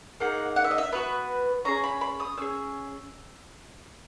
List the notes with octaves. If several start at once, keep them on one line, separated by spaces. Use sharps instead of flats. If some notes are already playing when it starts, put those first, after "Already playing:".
A#3 D#4 G#4 F#5
F#5
E5
D#5
E5
B3 F#4 B4
C#4 E4 G#4 A#5
B5
B5
D#6
C#4 G#4 E6